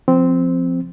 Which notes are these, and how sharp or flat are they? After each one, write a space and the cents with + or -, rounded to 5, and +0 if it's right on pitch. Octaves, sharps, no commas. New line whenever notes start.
F3 +0 C4 -10